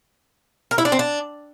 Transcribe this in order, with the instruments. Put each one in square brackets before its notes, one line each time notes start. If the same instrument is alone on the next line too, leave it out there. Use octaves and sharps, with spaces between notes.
[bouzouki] A#4
E4
D4
C4
D4